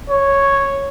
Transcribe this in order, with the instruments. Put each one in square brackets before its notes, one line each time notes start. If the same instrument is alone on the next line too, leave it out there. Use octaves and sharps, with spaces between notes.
[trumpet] C#5